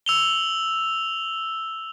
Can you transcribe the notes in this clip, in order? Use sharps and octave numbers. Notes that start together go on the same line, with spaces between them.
E6 F7 G7